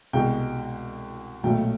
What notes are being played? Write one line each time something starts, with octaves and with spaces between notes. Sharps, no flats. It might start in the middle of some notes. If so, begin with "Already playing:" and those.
C2 B2 G#3 G5
B1 A#2 F#3 A3 G5